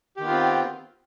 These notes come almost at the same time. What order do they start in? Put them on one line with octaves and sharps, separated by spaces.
G4 D#3 B3 F4 C4